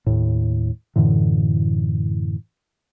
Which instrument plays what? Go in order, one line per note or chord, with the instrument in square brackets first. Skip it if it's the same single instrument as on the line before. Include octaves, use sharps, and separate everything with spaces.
[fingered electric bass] D#2 A2
F#2 A2 D3 E3